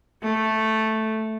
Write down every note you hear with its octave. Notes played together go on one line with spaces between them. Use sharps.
A3